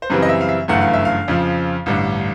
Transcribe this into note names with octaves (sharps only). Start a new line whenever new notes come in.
C5
F#2 C#3 E3 G3 C4 B4
D#5
E5
F5
E5
G1 F#2 C#3 E3 A3 F#5
F5
E5
F5
F2 C#3 F3
A1 G2 D3